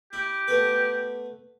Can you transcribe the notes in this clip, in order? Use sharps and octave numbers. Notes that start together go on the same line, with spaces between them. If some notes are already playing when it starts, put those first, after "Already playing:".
E4 G4
A3 B3 B4